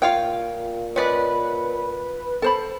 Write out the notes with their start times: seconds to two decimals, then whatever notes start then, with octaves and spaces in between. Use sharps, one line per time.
0.02 A#2 F4 C#5 F5 G5
0.96 C#4 B4 D5 D#5
2.42 A4 C5 A5 B5